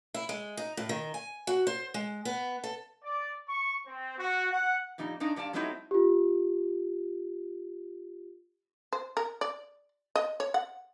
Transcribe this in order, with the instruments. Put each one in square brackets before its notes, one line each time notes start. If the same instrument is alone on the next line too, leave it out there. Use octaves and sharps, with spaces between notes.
[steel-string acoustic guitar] E4
G#3
D#4
A2
D#3
G#5
F#4
C5
G#3
B3
A4
[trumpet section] D5
C#6
C4
F#4
F#5
[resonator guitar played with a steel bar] F2 A#2 G3 D#4
G2 D4 D#4 D5
G2 G3 D5 F5 A5
F#3 G3 A3 C4 D#4 E4
[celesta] F4 G4
[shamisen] C5
A#4
D5
D#5
C#5
F#5